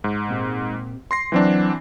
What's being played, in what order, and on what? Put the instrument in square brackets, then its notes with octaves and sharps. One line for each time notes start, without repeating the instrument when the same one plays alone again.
[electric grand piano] G#2
[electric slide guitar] A#2 C4 G4
[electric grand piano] C6 A#6 C7
[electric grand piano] E3 C4 D4 [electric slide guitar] F#3 F#5